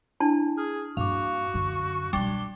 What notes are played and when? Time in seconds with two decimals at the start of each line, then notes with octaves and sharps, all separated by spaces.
0.20 D4 E4 A5
0.58 G#4 F6
0.97 G2 A#3 F#4 F5 D6
1.54 F#2 D3
2.13 B2 F#3 G3 D4 G7